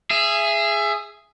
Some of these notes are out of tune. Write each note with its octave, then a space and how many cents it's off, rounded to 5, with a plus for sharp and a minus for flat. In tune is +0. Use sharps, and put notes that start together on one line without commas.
G#4 +0 E5 +25